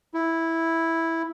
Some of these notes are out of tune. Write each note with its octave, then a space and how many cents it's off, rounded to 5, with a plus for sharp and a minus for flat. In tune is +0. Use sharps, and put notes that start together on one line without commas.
E4 -5